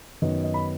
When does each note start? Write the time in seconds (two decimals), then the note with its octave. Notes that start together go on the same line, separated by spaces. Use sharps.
0.22 F#2 D#3 B3 D#5
0.44 D#5
0.54 B5